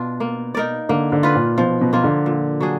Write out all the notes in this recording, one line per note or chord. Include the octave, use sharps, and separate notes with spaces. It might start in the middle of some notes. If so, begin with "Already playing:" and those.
Already playing: B2 D4 F4
A#3
D#4 A#4 D5
D3 A#3
D3
F4 B4
A#2
B2 F3
B2
B2 A#3 F4
D3
A#2
F#3 D4 G#4